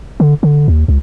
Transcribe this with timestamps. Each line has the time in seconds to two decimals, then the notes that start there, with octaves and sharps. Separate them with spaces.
0.20 D3
0.43 D3
0.68 D#2
0.88 C#2